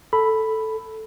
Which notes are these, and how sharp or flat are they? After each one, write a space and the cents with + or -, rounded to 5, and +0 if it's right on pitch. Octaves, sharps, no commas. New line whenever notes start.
A4 +0 B5 +0